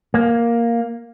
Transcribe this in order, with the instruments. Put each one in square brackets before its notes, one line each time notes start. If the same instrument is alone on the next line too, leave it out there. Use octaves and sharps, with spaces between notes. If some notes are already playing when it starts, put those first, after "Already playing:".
[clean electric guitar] A#3